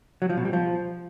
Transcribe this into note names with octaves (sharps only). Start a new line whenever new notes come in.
F#3
F3
B2
G3
F3